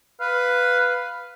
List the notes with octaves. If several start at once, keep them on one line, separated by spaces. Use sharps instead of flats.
B4 F5